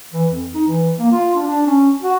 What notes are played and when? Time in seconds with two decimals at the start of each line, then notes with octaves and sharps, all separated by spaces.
0.13 E3
0.30 F2
0.54 D#4
0.68 E3
0.99 A#3
1.12 F4
1.34 D4
1.47 D4
1.67 C#4
2.02 F#4